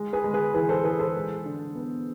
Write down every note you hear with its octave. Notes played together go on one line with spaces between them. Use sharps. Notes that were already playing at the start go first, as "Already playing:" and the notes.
Already playing: G#3
G#4 B4
G#3
G#4 B4
E3 G#4 B4
A4 C5
E3 G#4 B4
A4 C5
G#3
D3
B3